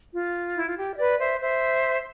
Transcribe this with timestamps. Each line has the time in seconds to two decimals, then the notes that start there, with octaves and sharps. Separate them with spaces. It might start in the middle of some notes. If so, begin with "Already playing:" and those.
0.14 F4
0.55 E4
0.66 F4
0.77 G4
0.94 E5
0.98 B4 D5
1.19 C5 E5
1.41 C5 E5